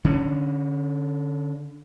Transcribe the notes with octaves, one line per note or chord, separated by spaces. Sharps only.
D3 C#4